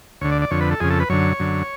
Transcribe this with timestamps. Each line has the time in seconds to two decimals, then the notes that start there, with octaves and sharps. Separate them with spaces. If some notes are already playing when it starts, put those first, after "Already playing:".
0.21 D2 D3 C#5
0.32 D5
0.42 D5
0.51 F2 D3 C#5
0.61 B4
0.71 A4
0.80 F2 C#3 G#4
0.90 A4
1.00 B4
1.10 F#2 D3 C#5
1.39 F#2 D3